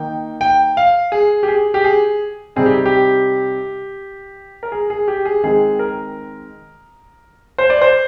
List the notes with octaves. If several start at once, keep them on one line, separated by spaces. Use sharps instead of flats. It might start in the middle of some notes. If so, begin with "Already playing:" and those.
Already playing: D#3 A#3 D#4 G5
G5
F5
G#4
G4
G#4
G4
G#4
C3 G3 C4 D#4 G#4
G4
G4
A#4
G#4
G#4
G4
G#4
D#3 G#3 C4 G#4
A#4
C5
D5
C5